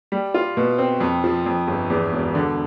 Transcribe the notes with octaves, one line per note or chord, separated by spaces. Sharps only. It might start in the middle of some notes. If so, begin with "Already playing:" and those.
G3
F4
B2
C4
F2
F3
F2
G1
E2
E1
D3